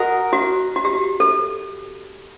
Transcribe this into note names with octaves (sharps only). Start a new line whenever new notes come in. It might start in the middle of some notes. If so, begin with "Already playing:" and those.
Already playing: F#4 A#4 D#5 F#5
F#4
F#4
G4
F#4
A4